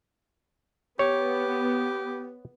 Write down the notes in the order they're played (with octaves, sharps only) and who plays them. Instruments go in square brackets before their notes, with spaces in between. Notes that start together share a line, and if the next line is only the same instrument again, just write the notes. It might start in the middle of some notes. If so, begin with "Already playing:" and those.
[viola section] B3 [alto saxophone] G4 [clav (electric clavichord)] C#5